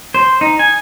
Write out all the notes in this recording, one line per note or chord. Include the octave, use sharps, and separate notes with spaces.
C5
D#4
G#5